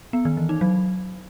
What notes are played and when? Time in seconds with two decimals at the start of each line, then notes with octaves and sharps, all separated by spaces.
0.13 B3
0.25 D#3
0.37 E3
0.49 D#4
0.61 F#3